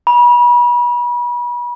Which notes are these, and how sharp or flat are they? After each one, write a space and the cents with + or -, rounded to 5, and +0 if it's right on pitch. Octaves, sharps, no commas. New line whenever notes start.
B5 -35